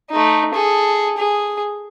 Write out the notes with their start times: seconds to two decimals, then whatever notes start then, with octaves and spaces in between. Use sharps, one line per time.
0.11 A3 D#4
0.54 G#4 A4
1.17 G#4